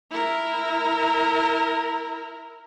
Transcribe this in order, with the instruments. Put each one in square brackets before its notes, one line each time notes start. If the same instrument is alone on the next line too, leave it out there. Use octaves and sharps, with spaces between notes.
[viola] E4 A#4